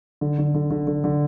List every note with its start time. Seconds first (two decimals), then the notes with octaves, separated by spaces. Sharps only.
0.21 D3
0.38 D3
0.55 D3
0.71 D3
0.87 D3
1.04 D3